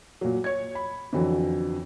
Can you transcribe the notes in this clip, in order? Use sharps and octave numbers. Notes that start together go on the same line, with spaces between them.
A#2 F#3
C#5 G#6
B5
F2 D3 E3 F#3